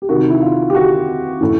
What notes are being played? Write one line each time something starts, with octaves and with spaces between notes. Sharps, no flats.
G4
C3 D#3 F#4
E4
F4
G4
F#4
A2 E3